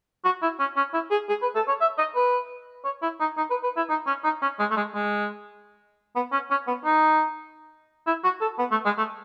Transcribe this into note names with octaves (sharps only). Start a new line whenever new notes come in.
F#4
E4
C#4
C#4
E4
G#4
G#4
B4
A4
C#5
E5
D#5
B4
C#5
E4
D#4
D#4
B4
B4
E4
D#4
C#4
D#4
C#4
G#3
A3
G#3
G#3
B3
C#4
C#4
B3
D#4
E4
F#4
A4
B3
A3
G#3
A3